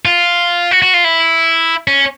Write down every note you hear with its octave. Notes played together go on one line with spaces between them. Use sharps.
F4
F#4
F#4
F4
E4
C#4